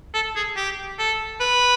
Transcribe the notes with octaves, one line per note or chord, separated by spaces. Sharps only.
A4
G#4
G4
A4
B4